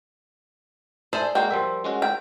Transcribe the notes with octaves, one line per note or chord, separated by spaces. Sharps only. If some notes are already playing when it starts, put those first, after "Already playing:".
G#4 A4 C5 D5 E5
G#3 A#3 F#4 G5
F3 G3 A#4 E5 C6
G#3 C#4 F#4
G5